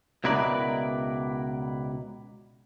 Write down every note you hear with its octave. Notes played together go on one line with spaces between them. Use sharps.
C#2 B2 E4 A#4 B4 D5